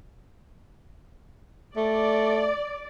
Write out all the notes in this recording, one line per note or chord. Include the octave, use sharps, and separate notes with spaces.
A3 D5